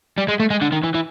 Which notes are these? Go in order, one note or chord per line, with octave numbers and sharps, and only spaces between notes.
G3
G#3
A3
G#3
D3
D#3
E3
E3